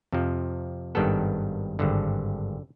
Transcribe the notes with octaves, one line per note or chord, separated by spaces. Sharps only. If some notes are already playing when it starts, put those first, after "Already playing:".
F2 C3 F3
G#1 G2 D#3 G3 B3 A4
G#1 G2 D3